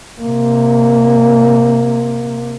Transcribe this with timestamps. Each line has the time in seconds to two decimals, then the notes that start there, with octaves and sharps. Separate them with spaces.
0.21 C3 A#3